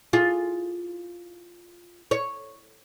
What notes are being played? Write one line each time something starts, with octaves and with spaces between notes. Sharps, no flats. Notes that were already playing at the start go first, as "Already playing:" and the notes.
F4 G#4
C#5